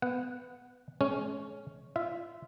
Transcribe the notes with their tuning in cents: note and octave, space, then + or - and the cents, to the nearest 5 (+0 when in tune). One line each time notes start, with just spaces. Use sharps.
B3 +15 F#5 -5
G#3 +40 C#4 +0
F4 -30 E5 +0